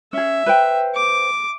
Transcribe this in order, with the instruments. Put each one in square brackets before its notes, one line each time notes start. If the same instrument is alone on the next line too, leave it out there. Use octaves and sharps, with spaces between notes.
[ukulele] C#4 G#4 [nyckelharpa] E5
[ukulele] B4 C5 G5
[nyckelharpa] D6